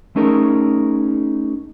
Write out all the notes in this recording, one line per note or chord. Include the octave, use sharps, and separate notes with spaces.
A3 C#4 D#4 G#4 A#4